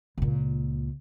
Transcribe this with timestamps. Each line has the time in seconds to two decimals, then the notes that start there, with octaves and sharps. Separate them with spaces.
0.18 C#2 A#2